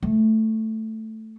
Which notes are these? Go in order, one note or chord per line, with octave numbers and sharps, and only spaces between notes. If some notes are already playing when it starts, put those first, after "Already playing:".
A3